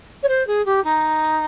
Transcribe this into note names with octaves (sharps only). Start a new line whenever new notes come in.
C#5
C5
G#4
G4
D#4